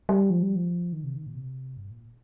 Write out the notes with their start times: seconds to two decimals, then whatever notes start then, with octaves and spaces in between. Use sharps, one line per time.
0.09 G3
0.30 F3
0.43 G3
0.56 F3
0.93 D#3
1.04 C3
1.16 D#3
1.26 A#2
1.35 C3
1.77 G2
1.91 A#2